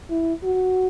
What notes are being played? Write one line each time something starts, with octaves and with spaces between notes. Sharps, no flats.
E4
F#4